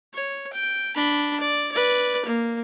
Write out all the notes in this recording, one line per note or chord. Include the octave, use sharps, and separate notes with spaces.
C#5
G5
D4 B5
D5
B4 D5
A#3